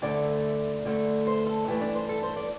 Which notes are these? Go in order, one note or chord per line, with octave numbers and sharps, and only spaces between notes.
D2 D3 A3 D5
D2 D3 A3
C5
A4
G2 E3 A3 G4
D4
C5
A4
C5
D5